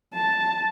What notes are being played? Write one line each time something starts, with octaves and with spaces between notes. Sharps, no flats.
A5